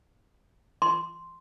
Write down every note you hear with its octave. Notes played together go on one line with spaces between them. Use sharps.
C6